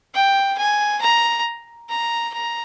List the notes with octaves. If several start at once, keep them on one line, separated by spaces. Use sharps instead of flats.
G5
G#5
A#5
A#5
A#5